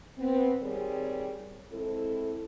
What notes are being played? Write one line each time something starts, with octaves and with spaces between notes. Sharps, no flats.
B3 C4
D#3 G3 C4 G#4 A#4 C#5
G#3 C4 E4 A4